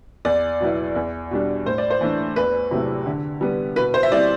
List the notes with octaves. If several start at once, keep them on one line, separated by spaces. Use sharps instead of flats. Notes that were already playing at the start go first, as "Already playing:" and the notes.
E2 D5
B2 F#3 B3 E4
E2
B2 G3 D4
A2 C5
D5
C5
E3 A3 D4
E2 B4
C3 F#3 A3 E4
D3
G3 B3
B2 B4
C5
E5
G3 C4 E4 D5